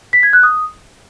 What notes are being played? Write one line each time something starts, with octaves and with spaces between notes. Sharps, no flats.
B6
G#6
F#6
D#6